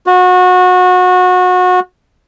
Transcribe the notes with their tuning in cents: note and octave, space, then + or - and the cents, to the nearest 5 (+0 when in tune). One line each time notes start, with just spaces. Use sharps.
F#4 -25